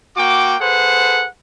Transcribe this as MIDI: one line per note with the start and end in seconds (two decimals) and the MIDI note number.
0.16 0.55 58
0.16 0.55 66
0.16 0.55 79
0.16 0.55 86
0.60 1.26 68
0.60 1.26 69
0.60 1.26 71
0.60 1.26 72
0.60 1.26 78